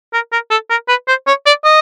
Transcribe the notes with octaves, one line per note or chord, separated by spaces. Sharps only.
A#4
A#4
A4
A#4
B4
C5
C#5
D5
D#5